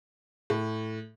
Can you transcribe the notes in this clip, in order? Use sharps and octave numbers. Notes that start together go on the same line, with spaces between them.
A2